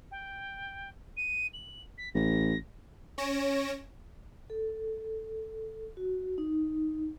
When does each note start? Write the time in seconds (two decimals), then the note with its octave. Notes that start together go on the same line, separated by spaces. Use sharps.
0.11 G5
1.17 D#7
1.54 F#7
1.98 B6
2.15 A1 A#6
3.18 C#4 C#5 A#6 D7 E7
4.50 A4
5.97 F#4
6.38 D#4